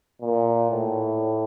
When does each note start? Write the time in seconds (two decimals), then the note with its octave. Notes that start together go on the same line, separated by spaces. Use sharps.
0.21 A#2
0.71 A2